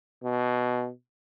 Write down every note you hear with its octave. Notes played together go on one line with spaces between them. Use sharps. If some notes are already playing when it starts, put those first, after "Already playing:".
B2